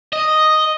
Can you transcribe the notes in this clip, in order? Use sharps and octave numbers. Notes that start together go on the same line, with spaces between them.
D#5